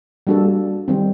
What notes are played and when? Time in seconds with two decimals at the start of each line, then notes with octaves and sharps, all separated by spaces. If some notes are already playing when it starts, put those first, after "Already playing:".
0.27 G3 A#3 D4 F#4 A4
0.88 D#3 G3 C4